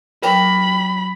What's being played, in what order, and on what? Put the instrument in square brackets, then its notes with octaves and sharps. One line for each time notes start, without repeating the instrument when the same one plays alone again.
[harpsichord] F#3 G4 A#4 [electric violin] B5